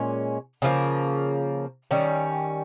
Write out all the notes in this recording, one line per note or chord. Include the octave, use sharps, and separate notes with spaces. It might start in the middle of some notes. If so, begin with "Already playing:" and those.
Already playing: A#2 G#3 C#4
C#3 F3 A#3
D#3 G3 C#4